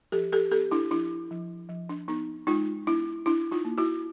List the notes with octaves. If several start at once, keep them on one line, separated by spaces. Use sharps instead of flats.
F3 G4 A4
G4 A4
B3 G4 A4
D4 E4
F3 D4 E4
F3
F3
D4
B3 D#4
G#3 D#4 F4
B3 D4 E4
D4 E4
D#4 F4
A#3
E4 F#4